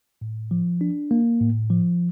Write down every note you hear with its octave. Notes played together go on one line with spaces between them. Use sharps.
A2
F3
D4
A#3
A2
F3